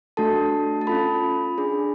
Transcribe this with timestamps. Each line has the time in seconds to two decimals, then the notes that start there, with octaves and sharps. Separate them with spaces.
0.17 A3 D4 F#4 A4 A5
0.81 A5
0.87 C#4 F4 A4 B5
1.58 D4 G#4